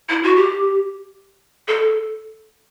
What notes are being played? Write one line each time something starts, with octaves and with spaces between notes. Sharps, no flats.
E4
F#4
G4
A4